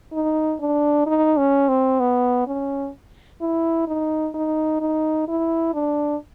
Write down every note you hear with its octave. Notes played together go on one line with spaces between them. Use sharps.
D#4
D4
D#4
C#4
C4
B3
C#4
E4
D#4
D#4
D#4
E4
D4